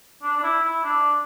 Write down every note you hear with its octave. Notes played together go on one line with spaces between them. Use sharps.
D4
D4
E4
E4
D4